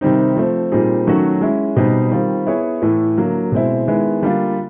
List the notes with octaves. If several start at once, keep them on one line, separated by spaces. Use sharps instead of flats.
C3 D#3 G3 C4 D#4
F3 A3 C4
A#2 G3 C4 D#4 G#4
D#3 F#3 A3 C#4 F#4
G#3 C#4 E4
B2 G3 C4 D#4
D#3 G3 C4 F4
B3 E4 G#4 C#5
A2 E3 A3
D3 F#3 A#3
B2 G#3 C4 E4
D#3 G#3 B3 E4
D3 G3 A#3 D4 F4